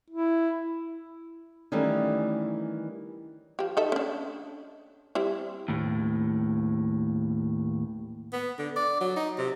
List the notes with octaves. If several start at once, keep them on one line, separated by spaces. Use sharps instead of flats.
E4
D#3 E3 G3 A3 C#4
F3 G4
D#4 A4 E5
C#4 D4
G3 C4 E4
D#2 A2
B3
D3
D5
F#3
D#4
C3